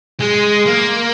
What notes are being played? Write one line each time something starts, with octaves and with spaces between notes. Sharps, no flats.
G#3
A#3